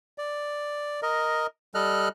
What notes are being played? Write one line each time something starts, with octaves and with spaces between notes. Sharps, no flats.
D5
A#4 D#5
G3 A4 D#5 F6 F#6